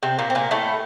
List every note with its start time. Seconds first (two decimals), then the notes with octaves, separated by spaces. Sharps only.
0.03 C3 C4
0.19 A#2 A#3
0.30 C4
0.35 A#2 A#3
0.51 A2 A3